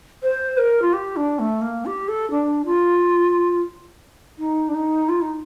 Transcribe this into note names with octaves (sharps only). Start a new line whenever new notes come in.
C5
A#4
F4
G4
D4
A3
A#3
G4
A4
D4
F4
D#4
D4
D#4
F4
D#4